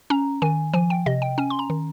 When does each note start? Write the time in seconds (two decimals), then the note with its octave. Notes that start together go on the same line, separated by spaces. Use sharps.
0.10 C#4 A#5
0.42 D#3 G#5
0.73 F3 G#5
0.90 G5
1.06 C3 D#5
1.22 G5
1.38 C#4 G#5
1.50 C6
1.59 A#5
1.70 D#3